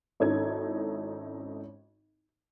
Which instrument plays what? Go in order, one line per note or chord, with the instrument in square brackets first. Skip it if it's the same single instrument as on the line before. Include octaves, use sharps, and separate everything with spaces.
[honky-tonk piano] G#1 C#4 D#4 E4 A4 G#6